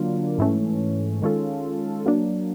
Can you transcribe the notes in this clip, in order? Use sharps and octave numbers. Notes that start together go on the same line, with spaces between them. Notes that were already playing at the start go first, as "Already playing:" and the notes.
Already playing: D3 F#3 A#3 D4 F4
G#2 E3 A3 C#4
D#3 G#3 C#4 F4 A4
F#3 A#3 D4